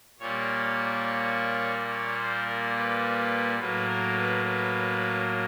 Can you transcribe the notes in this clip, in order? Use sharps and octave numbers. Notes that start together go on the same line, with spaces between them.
A#2 G3 A#3 C#5
C#5
C5
A#4
B4
A2 F#3 A#3 B4
A#4
B4
B4